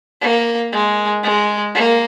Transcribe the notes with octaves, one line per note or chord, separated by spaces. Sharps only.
A#3
G#3
G#3
A#3